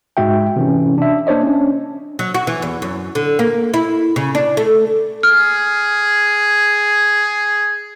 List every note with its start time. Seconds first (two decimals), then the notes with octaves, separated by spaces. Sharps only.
0.17 G#2 G#3 F#4 E5 G5
0.56 C3 E3 C#4
0.98 D4 E5
1.27 A#3 D4 C5 C#5 D#5
1.43 C#4 D4
2.19 F#3
2.34 F#4
2.47 E3
2.62 E2
2.82 F#2
3.15 D3
3.39 A#3
3.74 E4
4.16 C#3
4.35 D4
4.57 A3
5.23 G#4 F6